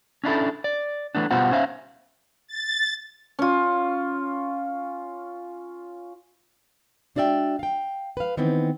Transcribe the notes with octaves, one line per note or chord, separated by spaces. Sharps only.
C#4 D4 E4 A4
D5
E3 A3 B3 D4
B2 G3 B3 F4 C5 F#5
C#4 C5 E5 F5
A6
C#4 F4
G#3 D4 F#4 D5 E5 G5
F5 G5
B4 F5
D#3 E3 B3 C4